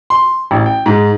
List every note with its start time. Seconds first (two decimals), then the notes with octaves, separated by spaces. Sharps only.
0.10 C6
0.51 A1
0.66 G5
0.86 G#2